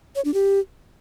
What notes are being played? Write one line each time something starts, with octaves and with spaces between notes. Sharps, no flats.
C#5
D4
G4